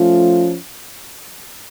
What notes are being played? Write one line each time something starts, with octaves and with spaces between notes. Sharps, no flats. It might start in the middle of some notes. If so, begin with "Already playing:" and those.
Already playing: F3 A3 C#4 F4